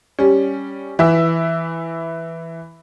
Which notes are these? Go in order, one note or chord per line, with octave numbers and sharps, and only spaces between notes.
G3 C#4
E3 E5 E6